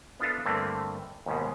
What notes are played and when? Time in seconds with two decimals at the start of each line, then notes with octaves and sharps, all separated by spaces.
0.20 B3 D4 F4 A4 E5 F5
0.46 G2 D3 A3 A#3 C4
1.26 D#2 G#2 B2